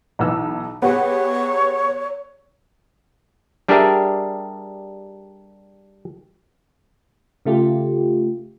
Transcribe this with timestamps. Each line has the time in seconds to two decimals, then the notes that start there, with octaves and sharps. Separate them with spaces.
0.19 B1 E3 E6
0.82 B3 G4 G#4 C#5
3.68 G3 D4 G4 G#4 A#4 E5
7.45 C#3 A3 F4 G4